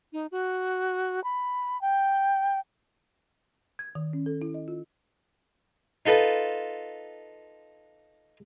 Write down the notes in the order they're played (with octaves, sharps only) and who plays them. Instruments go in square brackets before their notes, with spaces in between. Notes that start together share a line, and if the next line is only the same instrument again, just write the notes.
[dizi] D#4
F#4
B5
G5
[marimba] G#6
D#3
C#4
A4
E4
D#5
F4
[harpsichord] D#4 F4 A4 B4